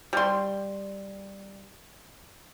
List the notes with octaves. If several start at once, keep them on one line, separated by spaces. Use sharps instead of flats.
G3 C6